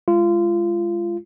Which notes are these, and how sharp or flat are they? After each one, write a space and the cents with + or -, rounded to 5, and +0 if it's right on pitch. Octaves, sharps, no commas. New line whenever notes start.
G#3 +0 F4 -25